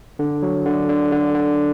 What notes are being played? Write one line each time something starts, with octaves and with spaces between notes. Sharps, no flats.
D3
F#3
D3
D3
D3
D3